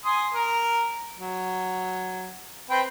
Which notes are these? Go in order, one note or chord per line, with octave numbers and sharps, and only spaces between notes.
G#5 C6 D#6
A#4
F#3
C4 B4 G5